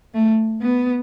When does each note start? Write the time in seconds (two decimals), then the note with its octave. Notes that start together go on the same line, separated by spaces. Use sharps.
0.14 A3
0.61 B3